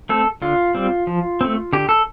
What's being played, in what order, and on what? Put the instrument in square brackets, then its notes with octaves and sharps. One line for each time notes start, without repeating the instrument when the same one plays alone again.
[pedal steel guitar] A3 C4 A4
D3 F4
G3 C4
F3
A3 C4
D3 G4
A4